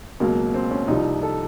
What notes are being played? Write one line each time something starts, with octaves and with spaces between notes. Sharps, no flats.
C#2 B2 F#3 A#3
C4
C#4
C2 C3 F3 D#4
A4